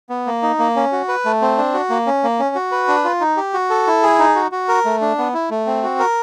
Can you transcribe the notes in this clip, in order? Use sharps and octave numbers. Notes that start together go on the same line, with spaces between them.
B3
A#3
D#4
A#3
C#4
F#4
B4
A3
C4
D4
F#4
A#3
C#4
A#3
C#4
F#4
B4
D4
F4
D#4
G4
F#4
A4
E4
G#4
D#4
F#4
F#4
A#4
A3
D4
B3
E4
A3
C4
F#4
A#4